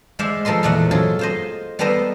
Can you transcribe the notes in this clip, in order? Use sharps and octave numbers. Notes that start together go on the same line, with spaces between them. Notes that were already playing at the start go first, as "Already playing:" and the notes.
G#3 C5 D5 E5 F5
F3 A4 A#4 D#5 C6
E2 A#2 A3 D#5 F#5
F#3 F4 G#4 A4
F4 C5 D#5
G3 B3 A4 A#4 C5 D#5